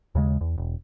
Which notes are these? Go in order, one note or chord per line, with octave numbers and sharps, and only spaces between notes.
D#2 C#3 G#3
E2
E1